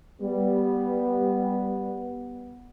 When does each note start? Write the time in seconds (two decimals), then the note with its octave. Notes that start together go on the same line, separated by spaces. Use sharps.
0.22 G3 B3